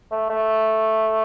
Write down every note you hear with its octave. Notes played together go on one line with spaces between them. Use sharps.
A3
A3